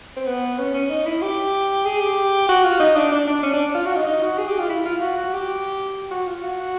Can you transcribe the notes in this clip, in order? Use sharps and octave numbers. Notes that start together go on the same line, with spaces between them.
C4
B3
C#4
C#4
D#4
E4
G4
G#4
G4
F#4
F4
D#4
D4
D4
D4
C#4
D4
F4
F#4
D#4
D#4
F#4
G#4
G4
F4
E4
F4
F#4
F#4
G4
F#4
F4
F#4